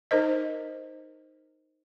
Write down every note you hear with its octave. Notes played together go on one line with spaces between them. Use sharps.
D#4 A#4 C5 D#5